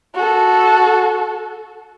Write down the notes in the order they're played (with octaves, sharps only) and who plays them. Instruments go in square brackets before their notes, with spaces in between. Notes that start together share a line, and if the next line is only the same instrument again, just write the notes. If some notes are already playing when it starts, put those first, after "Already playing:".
[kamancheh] F#4 A4